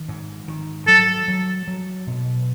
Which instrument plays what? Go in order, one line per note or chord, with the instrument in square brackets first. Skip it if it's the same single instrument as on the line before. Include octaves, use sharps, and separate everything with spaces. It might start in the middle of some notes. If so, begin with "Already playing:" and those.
Already playing: [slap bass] D#3
G#2
D#3
[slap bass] F#3 [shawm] A4
[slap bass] F#3
F#3
B2